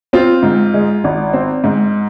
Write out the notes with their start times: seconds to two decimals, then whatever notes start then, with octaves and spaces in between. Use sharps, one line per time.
0.13 C4 F4
0.43 G#2
0.74 G#3
1.04 G#1
1.33 C4
1.64 G#2